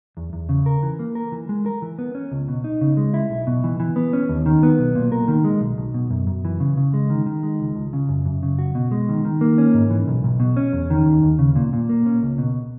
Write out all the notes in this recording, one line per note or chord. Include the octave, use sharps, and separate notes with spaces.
E2
E2
C#3
A#4
E3
A#3
A#4
E3
G#3
A#4
E3
B3
C#4
C#2
B2
D#4
C#3
G#3
E4
B1
B2
E3
E3
B3
C#4
D#2
D#3
B3
B1
A#2
A#4
D#3
G#3
B1
B1
B2
F#2
F#2
E3
C#3
C#3
G#3
D#3
D#3
G#3
C#2
C#2
C#3
F#2
F#2
C#3
F#4
B2
G#3
D#3
D#3
A#3
C#4
G#2
E3
B1
B1
B2
C#4
E2
D#3
D#2
D#2
C#3
A#2
A#2
A#3
C#4
C#2
B2